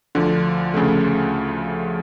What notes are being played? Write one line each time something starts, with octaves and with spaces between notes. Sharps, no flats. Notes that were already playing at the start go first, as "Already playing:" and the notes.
D2 D3 F3
D2 C#3 F3 A3